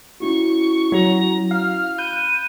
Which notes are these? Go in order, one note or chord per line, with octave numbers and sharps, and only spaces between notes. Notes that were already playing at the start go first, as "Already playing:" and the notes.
C#4 E4 F#4 C#6
F#3 A#5
F5 F6
B5 F#6 G6 D#7